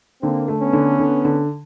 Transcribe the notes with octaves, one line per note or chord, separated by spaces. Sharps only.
D3 A#3 C4
A3
B3 C#4
D3
D3
D3